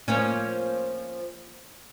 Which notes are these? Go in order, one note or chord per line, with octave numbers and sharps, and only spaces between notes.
F3 A#3 C#4